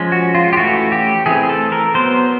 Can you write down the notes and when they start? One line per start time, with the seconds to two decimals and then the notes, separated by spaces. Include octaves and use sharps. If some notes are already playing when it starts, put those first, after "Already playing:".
Already playing: F3 G#3 C#4
0.12 F#4
0.35 F4
0.53 G4
0.57 E3 A3 C#4 F#4
0.92 G4
1.26 E3 A3 C4 G#4
1.49 A4
1.72 A#4
1.94 F#3 B3 C5